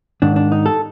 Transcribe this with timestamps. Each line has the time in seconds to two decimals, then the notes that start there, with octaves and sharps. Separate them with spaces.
0.22 G#2 D#3 D4
0.36 D4
0.52 D#4
0.66 A4